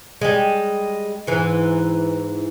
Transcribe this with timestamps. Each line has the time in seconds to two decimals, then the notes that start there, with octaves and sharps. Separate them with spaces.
0.21 G3 G#3
1.27 G#2 E3